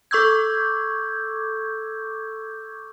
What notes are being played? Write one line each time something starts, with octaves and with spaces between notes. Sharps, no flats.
A4 C#6 D6 E6 G6 G#6